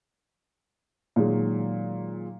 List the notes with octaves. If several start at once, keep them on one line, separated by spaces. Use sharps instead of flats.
A#2 D#3 F#3 G#3